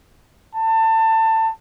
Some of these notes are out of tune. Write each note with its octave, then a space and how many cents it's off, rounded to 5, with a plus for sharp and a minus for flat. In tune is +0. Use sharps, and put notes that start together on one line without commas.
A5 +25